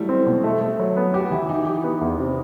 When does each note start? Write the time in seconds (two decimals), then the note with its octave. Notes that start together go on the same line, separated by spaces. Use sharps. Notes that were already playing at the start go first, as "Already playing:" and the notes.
Already playing: E3 F#3 G3 A3
0.09 C4
0.26 B2
0.44 A3
0.61 A3
0.79 F#3
0.97 B3
1.14 F#4 G4
1.31 E3 E4
1.49 E3 D#4
1.67 G4
1.84 B3
2.01 E2
2.19 C3